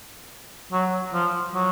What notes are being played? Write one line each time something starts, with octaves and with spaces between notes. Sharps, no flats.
F#3
F3
F#3